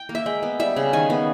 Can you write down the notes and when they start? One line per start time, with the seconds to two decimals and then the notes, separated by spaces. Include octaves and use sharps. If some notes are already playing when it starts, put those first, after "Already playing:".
Already playing: G5
0.09 A#3
0.15 E5
0.26 G#3 G5
0.43 B3
0.60 G3 E5
0.76 C#3
0.93 D#3 G#5
1.10 B3